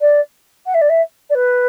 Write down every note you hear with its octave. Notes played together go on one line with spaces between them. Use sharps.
D5
F#5
E5
D5
E5
D5
B4